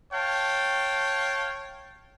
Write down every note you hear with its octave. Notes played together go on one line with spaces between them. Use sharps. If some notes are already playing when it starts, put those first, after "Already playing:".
C#5 F5 G5 A5